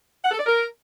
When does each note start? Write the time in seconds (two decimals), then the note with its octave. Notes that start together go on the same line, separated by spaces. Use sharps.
0.24 F#5
0.31 A4
0.39 D5
0.46 A#4